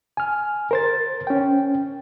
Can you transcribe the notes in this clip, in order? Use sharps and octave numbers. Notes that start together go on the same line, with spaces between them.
G#5 F6
A#4 C5 A6
C#4 G5